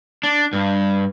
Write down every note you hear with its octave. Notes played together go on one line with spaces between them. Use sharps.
D4
G2